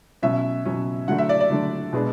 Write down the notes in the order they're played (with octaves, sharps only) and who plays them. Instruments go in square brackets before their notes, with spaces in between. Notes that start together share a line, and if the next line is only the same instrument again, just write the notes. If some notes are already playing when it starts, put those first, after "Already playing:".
[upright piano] B2 F#3 C#4 E5
B2 F#3 C#4
D3 F#3 A3 D4 F#5
E5
D5
D5
D3 F#3 A3 D4
B2 G#3 B3 D4